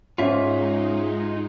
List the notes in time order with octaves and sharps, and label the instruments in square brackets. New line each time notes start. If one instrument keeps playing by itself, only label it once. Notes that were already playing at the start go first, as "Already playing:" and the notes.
[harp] G#2 [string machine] G#3 D#4 [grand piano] C#4 [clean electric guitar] F4 E5